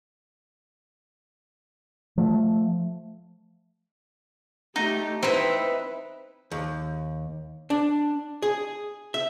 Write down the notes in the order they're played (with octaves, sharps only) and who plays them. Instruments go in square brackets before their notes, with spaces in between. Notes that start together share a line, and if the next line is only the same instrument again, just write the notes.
[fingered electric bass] F3 A3
[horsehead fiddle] A3 G4 [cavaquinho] D#4
[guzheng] C4 [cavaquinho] D#4 E4 E5 [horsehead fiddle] B4
[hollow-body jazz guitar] D#2
D4
G#4
E5